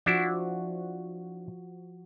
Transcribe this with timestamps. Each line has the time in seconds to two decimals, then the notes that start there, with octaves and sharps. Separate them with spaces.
0.06 F3 D4 E4 F#4